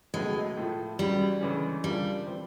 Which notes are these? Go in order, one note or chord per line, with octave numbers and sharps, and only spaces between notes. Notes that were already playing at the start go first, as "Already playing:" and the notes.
C#2 B2 F#3 G#3 A3
A2 F3 A3
C#2 C#3 F#3 G3
D2 C#3 E3 G#3 C#4
C#3 F3 G3 A#3 D4 F4
E3 G3 C4